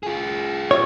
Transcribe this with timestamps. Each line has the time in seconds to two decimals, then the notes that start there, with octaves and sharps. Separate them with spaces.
0.03 F4 G#4
0.71 C#5